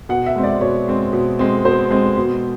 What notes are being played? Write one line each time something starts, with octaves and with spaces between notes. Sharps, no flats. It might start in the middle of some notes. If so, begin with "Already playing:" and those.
B2 F#5
E5
G#3 C4
D5
B2 C#5
G#3 C4
B2
G#3 C4
B2 C5
G#3 C4
B2